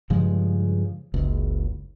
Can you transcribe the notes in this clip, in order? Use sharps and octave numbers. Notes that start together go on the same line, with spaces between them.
G2 C#3 F3 G#3
F#1 C#2